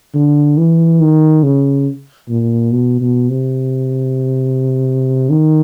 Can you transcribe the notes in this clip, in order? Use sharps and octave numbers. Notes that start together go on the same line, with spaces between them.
D3
E3
D#3
C#3
A#2
B2
B2
C3
D#3